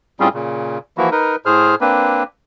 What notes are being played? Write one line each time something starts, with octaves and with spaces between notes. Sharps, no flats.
A2 G3 C4 C#4 F4 G#4
A#2 C#3
E3 F3 A#3 E4 F#4
D#4 A#4 B4
A2 G#4 C5 F6
A#3 C4 D4 B4